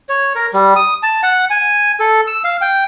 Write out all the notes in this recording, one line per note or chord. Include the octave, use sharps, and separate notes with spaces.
C#5
A#4
G3
D#6
A5
F#5
G#5
A4
E6
F5
G5